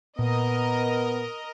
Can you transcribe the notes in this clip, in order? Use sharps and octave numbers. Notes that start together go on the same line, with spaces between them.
A#2 B3 A#4 D#5